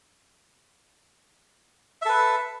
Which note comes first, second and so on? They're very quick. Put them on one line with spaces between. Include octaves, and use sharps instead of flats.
E5 A4 B4